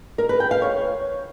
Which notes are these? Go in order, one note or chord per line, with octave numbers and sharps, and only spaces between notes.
A#4
B4
G5
F5
C#5